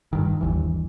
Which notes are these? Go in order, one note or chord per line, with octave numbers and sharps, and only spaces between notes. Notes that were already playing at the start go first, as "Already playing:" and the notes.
G2 D#3
G1 D#2 E3